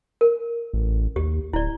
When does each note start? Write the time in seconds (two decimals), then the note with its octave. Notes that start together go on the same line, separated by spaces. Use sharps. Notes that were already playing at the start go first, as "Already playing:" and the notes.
0.21 A#4
0.73 A1
1.16 D#2 G4
1.53 D1 E4 D5